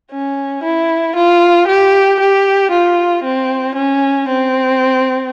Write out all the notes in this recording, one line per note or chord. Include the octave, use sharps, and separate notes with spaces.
C#4
E4
F4
G4
G4
F4
C4
C#4
C4